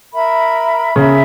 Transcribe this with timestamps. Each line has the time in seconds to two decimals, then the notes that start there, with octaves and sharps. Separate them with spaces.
0.13 A#4 E5 B5
0.96 C#3 A#4 E5 B5